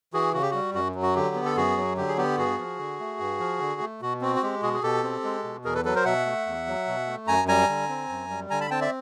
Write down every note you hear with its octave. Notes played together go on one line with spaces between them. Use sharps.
E3 F#4 G#4
C#3 F#4
G4
G3 F#4
F#2 F#4
F#3
F#4
D3 G4
B3
A4
F#2 F#4 G#4
F#3
D3 G4
G#4
B3 G4
G2 F#4 G#4
F3
D3
A3
G2
F3
D3
A3
B2 F#4
C4 F#4
F#4
G#3 G4
B2 F#4 G#4
G#4
B2 G4 A4
C4
G#3
B2
E2 G#4 A#4
A4 B4
F#3 A4 B4
A#4 C5
B2 E5 F#5
A3
E2
F#3
B2
A3
F#2 G#5 A#5
G3 G#5 A#5
D3
C4
F#2
G3
D3 G#5 A#5
A5 B5
C4 G5 A5
D5 E5